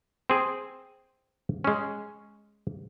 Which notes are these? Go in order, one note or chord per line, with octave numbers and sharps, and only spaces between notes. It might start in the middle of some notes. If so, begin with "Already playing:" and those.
C4 G#4
G#3 C#4